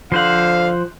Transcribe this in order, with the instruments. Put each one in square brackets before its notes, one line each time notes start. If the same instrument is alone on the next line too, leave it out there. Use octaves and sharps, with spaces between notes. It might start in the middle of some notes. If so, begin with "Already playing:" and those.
[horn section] D3 F5 [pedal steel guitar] F3 C5 F#5